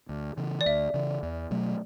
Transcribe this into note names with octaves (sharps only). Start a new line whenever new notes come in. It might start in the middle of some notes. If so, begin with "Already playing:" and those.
D2
C#3 E3
D5
D2 E5
C#3 E3
E2
B2 F#3 A3